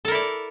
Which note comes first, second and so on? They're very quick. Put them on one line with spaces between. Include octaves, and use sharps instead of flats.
A4 A#4 E4 D5